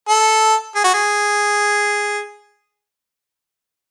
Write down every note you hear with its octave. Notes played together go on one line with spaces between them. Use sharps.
A4
G#4
F#4
G#4